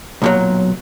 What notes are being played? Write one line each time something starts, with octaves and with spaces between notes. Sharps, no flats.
B1 A#2 F#3